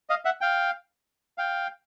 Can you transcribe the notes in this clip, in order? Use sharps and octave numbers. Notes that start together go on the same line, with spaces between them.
D#5 F5
E5 F#5
F5 G5
F5 G5